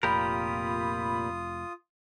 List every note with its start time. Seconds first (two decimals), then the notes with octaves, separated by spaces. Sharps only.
0.03 F1 A#2 F4 G4 A#4 B5 D#6